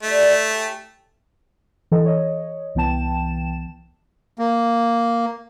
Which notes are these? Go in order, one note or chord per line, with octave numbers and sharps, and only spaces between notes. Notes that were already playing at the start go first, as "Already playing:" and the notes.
G3 A3 D#4
C#4 E4 G4
E3 A4 D#5
C#5 D#5
C2 E3 B3 G5 A5 E7
A#3